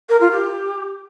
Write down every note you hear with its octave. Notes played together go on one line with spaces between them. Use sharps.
A#4
F4
G4